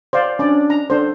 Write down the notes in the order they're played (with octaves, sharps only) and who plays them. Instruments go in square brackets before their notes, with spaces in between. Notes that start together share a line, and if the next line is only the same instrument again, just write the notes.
[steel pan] C5 D5 F5
[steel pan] C#4 D5 [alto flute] D4
[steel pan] A#5
[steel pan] D4 C5 [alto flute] A4